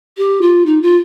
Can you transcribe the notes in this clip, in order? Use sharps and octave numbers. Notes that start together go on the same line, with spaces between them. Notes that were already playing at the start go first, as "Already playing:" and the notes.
G4
F4
D#4
F4